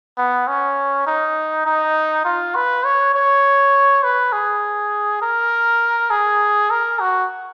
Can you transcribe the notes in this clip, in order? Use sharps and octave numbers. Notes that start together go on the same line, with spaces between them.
B3
C#4
D#4
D#4
F4
B4
C#5
C#5
B4
G#4
A#4
G#4
A#4
F#4